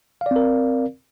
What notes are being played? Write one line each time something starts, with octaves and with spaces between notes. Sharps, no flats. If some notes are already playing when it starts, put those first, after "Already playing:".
C4 A#4 D5 F5